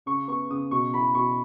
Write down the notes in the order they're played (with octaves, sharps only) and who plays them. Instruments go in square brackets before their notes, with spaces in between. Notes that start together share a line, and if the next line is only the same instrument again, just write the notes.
[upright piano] C#3 [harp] C#6
[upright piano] B3 [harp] C#6
[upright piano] C#3 [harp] D#6
[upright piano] B2 [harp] C#6
[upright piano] E4 [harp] B5
[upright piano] B2 [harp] C#6